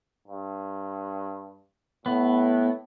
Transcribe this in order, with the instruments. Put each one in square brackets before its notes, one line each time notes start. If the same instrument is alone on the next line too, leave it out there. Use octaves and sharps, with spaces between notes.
[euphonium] G2
[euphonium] A2 [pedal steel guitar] B3